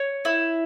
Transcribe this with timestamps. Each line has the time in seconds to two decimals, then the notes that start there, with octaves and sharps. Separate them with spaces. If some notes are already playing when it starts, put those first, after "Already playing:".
Already playing: C#5
0.25 E4